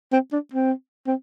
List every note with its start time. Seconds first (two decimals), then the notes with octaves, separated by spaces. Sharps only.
0.12 C4
0.32 D4
0.53 C4
1.07 C4